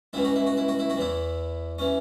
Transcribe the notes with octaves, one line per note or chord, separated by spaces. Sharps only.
C#2 C#3 E3 E4
F#4
E4
F#4
E4
F#4
E4
F#4
E2 E3 E4
E3 C#4